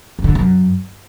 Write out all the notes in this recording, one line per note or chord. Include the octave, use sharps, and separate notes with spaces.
F2
D3
E2
F#2